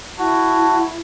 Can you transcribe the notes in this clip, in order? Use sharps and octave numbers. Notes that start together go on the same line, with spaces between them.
E4 F#4 A5